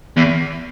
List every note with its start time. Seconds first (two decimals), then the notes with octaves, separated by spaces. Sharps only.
0.17 E2